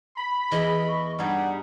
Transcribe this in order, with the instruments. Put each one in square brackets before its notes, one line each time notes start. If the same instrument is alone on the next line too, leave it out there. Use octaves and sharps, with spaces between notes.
[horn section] B5
[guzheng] E2 E3 [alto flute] G#4 [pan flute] D#5
[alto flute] C#6
[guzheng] G2 D#4 G#4 [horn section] G3 [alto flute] F#5